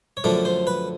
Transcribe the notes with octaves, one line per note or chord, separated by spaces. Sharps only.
C#5
F#2 D3 F3 A3 D5
C5
B4